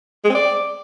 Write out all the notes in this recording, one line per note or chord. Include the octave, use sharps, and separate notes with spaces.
G#3
C4
D5